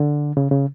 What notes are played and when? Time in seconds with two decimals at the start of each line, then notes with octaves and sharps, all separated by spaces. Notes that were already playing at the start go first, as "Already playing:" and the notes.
Already playing: D3
0.37 C#3
0.51 C#3